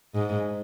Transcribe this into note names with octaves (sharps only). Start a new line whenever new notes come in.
G#2